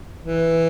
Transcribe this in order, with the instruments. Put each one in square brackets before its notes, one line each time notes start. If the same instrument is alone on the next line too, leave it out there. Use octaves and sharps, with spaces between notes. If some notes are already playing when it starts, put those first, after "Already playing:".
[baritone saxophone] E3